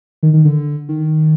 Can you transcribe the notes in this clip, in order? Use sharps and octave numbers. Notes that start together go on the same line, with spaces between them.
D#3
D#3
D3
D#3